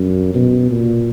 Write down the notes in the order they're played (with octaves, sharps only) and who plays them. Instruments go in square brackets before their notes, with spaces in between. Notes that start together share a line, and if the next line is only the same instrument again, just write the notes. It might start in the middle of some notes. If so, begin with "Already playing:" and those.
Already playing: [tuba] F#2
B2
A#2